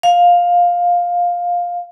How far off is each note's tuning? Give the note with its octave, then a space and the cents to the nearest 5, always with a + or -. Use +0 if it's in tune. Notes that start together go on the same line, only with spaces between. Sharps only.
F5 +10